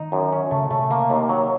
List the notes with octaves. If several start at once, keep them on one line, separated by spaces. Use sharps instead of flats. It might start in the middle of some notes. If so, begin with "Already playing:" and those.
Already playing: D#3 D#4
F#2
C#4
C#3 A3
C3 A3
A#3
D#2
F#3